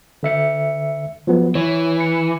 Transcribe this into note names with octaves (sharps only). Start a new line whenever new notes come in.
D3 E5 C#7
F3 F#3 B3
E3 C#5
C#7